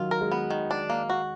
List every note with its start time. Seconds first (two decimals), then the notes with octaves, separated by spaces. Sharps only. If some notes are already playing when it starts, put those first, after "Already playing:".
Already playing: D#3 F#3 F4
0.11 A#4
0.21 G#3
0.32 B3
0.50 D#3
0.71 D4
0.90 A#3
1.10 F#4